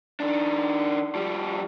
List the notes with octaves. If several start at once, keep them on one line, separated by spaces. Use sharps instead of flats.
D#3 D4
F3 G3